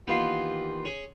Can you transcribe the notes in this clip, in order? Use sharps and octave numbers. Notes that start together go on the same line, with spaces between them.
D#3 E3 A#3 B3 F4 G4 C6
C#4 G#4